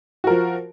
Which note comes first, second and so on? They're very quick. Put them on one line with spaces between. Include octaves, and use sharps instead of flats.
F#4 A#4 F3